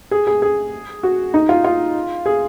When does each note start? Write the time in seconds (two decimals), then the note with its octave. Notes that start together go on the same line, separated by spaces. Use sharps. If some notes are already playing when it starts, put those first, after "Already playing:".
0.11 G#4
0.27 G#4
0.42 G#4
1.03 F#4
1.34 D#4
1.49 F4
1.64 F4
2.26 G#4